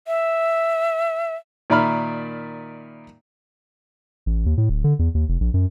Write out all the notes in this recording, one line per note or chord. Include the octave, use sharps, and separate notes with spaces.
E5
A#2 D#3 D5 E5 B5 F6
A1
D#2
A2
D1
D3
E2
D#2
F1
A#1
F#2